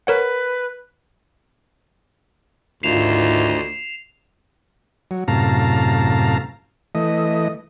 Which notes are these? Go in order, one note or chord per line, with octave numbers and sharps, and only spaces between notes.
A#4 B4 C#5 F#5
D2 G#2 D#3 E4 F4 C7 E7 F7
F#3
F#2 A2 C3 F5 A5 A#5
E3 A3 D#5